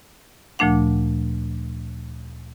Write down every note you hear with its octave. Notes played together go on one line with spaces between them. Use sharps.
D2 A#2 F3 A3 D4 F#5